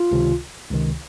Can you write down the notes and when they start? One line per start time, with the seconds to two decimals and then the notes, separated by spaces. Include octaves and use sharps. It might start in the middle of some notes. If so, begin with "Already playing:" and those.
Already playing: F4
0.11 C#2 C3 D#3
0.70 C#2 C3 D#3